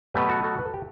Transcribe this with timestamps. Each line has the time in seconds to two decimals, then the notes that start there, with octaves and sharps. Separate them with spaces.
0.14 B2 F#3 A3 G4 B4
0.29 F#4 A4
0.44 F#4 A4
0.59 B4
0.66 A4
0.74 G4